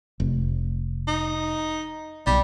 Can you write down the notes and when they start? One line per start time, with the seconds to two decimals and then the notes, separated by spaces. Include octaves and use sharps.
0.20 F1
1.08 D#4
2.27 B1 G3